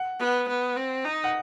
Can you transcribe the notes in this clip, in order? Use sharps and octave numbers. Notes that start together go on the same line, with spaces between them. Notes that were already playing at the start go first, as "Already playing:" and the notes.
Already playing: F#5
B3
B3
C4
D#4
F#5